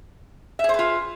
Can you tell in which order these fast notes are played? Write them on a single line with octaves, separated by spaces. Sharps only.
E5 G#4 C5 B4 F4